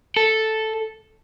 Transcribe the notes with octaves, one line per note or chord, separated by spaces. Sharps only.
A4